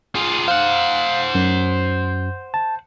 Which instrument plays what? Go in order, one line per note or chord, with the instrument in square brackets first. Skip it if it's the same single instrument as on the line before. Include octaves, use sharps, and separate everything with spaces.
[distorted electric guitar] F4 G#4
[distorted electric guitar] C5 F#5 [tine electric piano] F5
[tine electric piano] F#2
A5